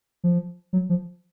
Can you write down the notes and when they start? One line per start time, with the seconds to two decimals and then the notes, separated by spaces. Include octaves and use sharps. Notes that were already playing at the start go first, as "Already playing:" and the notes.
0.24 F3
0.73 F#3
0.89 F3